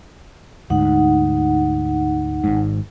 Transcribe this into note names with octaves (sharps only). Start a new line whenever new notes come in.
D2 G#2 D#4 F#5
G#1 G#2